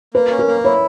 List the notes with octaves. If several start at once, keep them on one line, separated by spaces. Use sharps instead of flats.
A#3 B4
C#4
A#4
A#3
E4 C#5